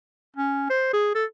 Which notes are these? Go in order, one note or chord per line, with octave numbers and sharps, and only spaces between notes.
C#4
C5
G#4
A4